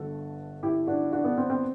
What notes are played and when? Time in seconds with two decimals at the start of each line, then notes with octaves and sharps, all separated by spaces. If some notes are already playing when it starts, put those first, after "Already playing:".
Already playing: G1 G2 D3 F#4 A4
0.63 E4 G4
0.87 D4 F#4
1.12 D4 F#4
1.24 B3 D4
1.38 C4
1.50 C4